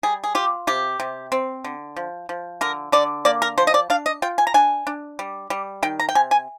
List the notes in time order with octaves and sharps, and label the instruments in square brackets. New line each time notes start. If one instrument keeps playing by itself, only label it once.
[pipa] G3 G#4
G#4
F4 G4
C3 G4
C3
C4
D3
F3
F3
D3 A#4
D3 D5
A#3 D5
A#4
F3 C5
D#5
D5
D4 F5
D#5
F4 G5
G#5
A#5
D4 G#5
D4
G3
G3
D#3 G5
A#5
G5
C3 G#5
G#5